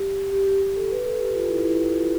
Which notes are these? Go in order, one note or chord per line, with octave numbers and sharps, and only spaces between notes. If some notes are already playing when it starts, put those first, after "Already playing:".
Already playing: G4
G4
G4
G4
A4
B4
A4
G4
F4
E4
E4
E4
F4